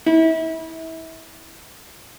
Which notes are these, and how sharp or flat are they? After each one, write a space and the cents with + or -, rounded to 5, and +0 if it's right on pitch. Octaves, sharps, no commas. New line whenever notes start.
E4 -30